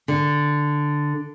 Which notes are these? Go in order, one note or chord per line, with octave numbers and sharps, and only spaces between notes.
D3